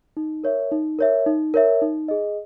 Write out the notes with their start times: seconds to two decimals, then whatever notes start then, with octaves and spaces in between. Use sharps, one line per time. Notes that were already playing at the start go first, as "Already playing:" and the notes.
0.17 D#4
0.44 A#4 C#5 E5
0.72 D#4
0.99 A#4 C#5 E5
1.26 D#4
1.54 A#4 C#5 E5
1.82 D#4
2.08 G#4 D#5